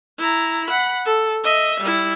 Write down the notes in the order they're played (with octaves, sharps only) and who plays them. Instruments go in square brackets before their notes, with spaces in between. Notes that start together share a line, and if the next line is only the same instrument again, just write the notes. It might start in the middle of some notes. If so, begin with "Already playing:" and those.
[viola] E4 A#5
F#5 B5
A4
D#5 E5
G3 E4